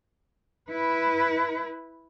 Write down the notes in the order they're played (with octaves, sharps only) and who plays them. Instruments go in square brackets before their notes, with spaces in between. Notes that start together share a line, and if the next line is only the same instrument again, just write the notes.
[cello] E4 B4